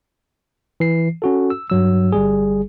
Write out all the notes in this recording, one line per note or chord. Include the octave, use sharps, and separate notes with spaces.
E3 C7
C#4 F#4 A4
E6
G2 F#3 E6
G1 G3 G#4